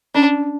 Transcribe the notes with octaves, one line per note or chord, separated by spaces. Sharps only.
C#4 D4